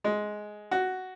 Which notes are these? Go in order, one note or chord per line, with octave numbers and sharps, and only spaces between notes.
G#3
F#4